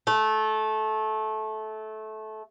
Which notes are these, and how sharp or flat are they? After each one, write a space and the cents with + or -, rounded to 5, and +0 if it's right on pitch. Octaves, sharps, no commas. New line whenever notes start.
A3 -20